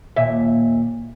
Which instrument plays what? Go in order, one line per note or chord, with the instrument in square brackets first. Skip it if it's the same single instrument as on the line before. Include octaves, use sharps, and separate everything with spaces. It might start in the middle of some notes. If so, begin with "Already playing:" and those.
[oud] D#2 A#2 E5